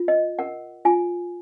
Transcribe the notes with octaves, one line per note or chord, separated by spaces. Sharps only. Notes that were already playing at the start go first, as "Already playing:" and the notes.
Already playing: F4
D#5
A#4 F#5
F4 G#5